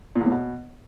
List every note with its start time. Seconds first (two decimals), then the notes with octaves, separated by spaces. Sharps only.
0.15 A#2
0.21 E2
0.26 A2
0.32 B2